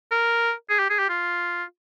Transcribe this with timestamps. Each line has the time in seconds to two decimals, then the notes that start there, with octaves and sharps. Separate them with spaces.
0.11 A#4
0.69 G#4
0.79 G4
0.90 G#4
0.99 G4
1.09 F4